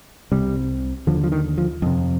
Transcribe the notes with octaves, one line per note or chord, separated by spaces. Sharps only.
C2 C3 G3
D#2 D3 F3
F3
D#3
F3
F2 C3